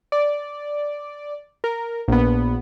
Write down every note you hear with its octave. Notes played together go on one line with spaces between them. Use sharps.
D5
A#4
A#1 B3